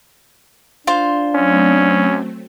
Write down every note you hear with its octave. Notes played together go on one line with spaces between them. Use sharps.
D4 F4 C5
F#3 A3 C4 C#4